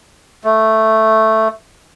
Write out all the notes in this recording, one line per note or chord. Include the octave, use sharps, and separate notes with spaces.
A3